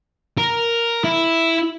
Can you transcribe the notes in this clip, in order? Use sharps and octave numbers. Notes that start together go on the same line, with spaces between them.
A#4
E4